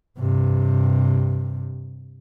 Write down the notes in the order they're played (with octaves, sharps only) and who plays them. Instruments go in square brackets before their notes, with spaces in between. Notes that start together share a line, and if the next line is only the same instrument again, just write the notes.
[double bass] G2 C3